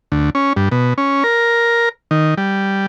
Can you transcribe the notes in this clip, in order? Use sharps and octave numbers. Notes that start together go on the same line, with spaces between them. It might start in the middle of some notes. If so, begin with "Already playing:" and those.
D2
C#4
G2
B2
C#4
A#4
D#3
G3